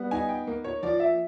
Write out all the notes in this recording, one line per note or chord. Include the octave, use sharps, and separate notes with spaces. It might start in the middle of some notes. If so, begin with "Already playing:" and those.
Already playing: G3 B3
D#4 G#5
G5
A#3
C#5
F3 D5
E5